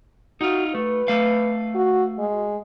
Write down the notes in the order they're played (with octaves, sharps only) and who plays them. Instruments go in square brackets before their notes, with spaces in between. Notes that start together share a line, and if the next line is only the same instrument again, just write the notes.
[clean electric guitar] D#4 F4 [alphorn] F#4
[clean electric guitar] A3 [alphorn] B4
[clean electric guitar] A3 F5
[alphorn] F#4
G#3